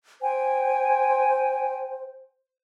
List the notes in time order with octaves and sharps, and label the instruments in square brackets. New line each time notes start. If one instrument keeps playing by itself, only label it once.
[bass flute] C5 [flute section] G5 G#5